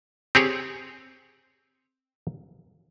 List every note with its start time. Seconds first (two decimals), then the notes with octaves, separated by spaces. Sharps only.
0.35 C4 G4 G#4 C#5